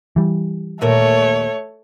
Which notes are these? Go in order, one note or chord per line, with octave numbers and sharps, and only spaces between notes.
E3 G3
D#2 A#2 A3 A#4 C#5